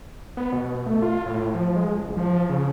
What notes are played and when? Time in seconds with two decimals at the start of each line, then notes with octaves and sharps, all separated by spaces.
0.37 B3
0.52 B2
0.86 A3
1.02 F4
1.26 A2
1.55 F3
1.76 G#3
1.99 F#1
2.17 F3
2.50 C#3